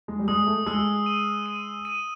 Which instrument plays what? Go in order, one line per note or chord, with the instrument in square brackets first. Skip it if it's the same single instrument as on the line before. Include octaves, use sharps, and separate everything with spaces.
[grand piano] G#3
G3
[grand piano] G#3 [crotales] D#6
[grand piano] A3
[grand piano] G#3 [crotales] E6
[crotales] D#7
D#7
D#7